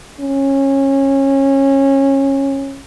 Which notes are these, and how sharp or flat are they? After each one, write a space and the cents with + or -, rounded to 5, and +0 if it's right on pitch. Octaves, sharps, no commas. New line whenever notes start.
C#4 -20